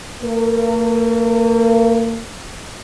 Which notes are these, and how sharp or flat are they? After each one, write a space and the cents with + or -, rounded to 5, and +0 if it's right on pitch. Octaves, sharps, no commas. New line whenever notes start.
A#3 -40 A#4 +35